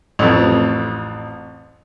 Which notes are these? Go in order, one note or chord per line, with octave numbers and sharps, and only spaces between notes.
A1 F2